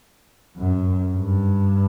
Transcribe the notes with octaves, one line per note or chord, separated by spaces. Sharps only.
F#2
G2